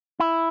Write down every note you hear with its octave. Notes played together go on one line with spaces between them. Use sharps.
E4